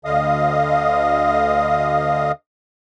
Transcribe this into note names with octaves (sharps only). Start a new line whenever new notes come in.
D2 D3 D#5 F5 D#6